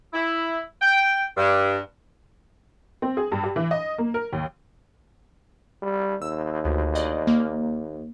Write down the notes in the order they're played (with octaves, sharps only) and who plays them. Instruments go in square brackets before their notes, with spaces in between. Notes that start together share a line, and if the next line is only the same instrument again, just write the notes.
[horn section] E4
G5
G2
[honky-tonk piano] C4
G#4
G2
G4
E3
D#5
A#3
A#4
D#2
[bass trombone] G3
[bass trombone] D#2 [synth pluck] E6
[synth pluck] D2
D5 D#5
A#3